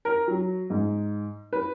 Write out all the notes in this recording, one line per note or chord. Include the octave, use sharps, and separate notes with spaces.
A#4
F#3
G#2
B4